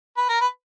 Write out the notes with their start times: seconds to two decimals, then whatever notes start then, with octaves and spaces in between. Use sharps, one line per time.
0.17 B4
0.29 A#4
0.41 B4